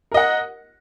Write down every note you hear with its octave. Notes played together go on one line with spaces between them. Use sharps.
A#4 D#5 F#5